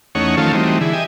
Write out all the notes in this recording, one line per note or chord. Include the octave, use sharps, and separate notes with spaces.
E2 A3 C#4 D#4 C#5 F#5
D#3 F3 A3 C#4 F4 A4
E3 F#3 G3 A3 C4 D#4
D3 E3 E4 G#4
G4 D#5 E5 G#5